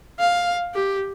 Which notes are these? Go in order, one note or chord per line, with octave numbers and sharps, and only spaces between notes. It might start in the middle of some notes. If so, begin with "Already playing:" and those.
F5
G4